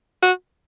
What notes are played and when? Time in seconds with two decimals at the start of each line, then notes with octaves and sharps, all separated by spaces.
0.22 F#4